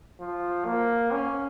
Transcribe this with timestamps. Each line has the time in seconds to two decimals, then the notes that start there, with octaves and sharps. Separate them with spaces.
0.20 F3
0.65 A#3
1.12 C#4